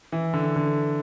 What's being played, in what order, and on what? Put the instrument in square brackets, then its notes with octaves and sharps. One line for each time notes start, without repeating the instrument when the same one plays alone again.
[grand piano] E3
D3
D3